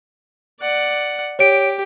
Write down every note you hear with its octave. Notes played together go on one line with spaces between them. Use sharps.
D5 F#5
G4 C#5 D7